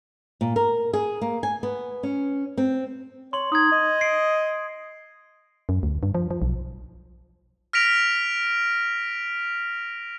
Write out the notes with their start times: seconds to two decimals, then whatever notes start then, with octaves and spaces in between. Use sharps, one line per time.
0.41 A#2
0.56 A#4
0.93 G#4
1.22 A#3
1.43 G#5
1.63 B3
2.03 C#4
2.58 C4
3.33 C#5 C6 F#7
3.52 D#4 D#6 G#6
3.72 D#5
4.01 C7 D7
5.69 F#2
5.83 D2
6.03 G2
6.15 F3
6.31 F3
6.42 B1
7.73 F6 A#6 B6 D7 F7